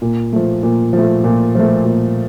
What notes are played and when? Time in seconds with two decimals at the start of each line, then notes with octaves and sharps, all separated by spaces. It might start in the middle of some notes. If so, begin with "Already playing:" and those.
0.02 A#2
0.33 F3 A3
0.63 A#2
0.93 F3 A3
1.24 A#2
1.55 F3 A3
1.85 A#2